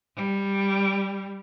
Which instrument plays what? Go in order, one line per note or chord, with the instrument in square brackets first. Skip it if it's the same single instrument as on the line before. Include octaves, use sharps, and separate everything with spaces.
[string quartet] G3